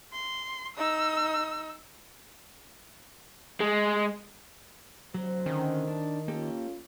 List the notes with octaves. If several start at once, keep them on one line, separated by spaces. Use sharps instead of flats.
C6
D#4 E6
G#3
D2 C3 F#3 C5
D3 D#3 C#4
D4
A#3 C#4 F4 G4 A4